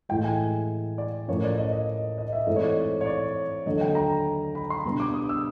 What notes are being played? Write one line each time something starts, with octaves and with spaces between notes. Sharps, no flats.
A2 E3 G#3 G5
G#5
D5
A2 F3 A#3 C#4 C#5
D5
D#5
D#5
D#5
E5
G#2 E3 A3 C4 D#5
C#5
D5
C#5
D5
D#2 D3 F#3 D#5
G5
A#5
B5
C6
B2 G3 B3 D4
D6
D#6
E6